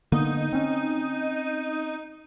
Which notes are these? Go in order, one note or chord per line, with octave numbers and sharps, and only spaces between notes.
D3 A#3 B3 D#4
C4 C#4